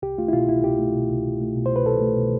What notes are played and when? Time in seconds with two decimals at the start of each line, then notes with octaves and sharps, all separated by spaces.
0.02 C2 G4
0.18 A3 F4
0.28 E4
0.33 B2 F4
0.48 C2 E4
0.64 C2 G4
0.79 A3
0.94 B2
1.10 C2
1.25 C2
1.41 A3
1.56 B2
1.66 C5
1.72 C2 B4
1.86 C2 A4
2.01 A3
2.17 B2